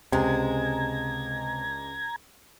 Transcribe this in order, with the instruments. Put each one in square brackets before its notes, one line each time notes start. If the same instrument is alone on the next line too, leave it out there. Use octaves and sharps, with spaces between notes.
[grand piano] C#2 [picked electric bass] C3 [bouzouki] G#3 D4 [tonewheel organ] A#5 G#6